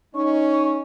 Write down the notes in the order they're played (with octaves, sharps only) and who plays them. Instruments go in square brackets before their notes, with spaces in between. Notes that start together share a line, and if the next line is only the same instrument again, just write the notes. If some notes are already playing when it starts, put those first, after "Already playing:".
[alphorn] C#4 [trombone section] D#4 [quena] C#6